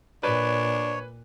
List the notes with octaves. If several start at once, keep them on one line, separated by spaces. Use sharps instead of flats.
A#2 D4 B4 C#5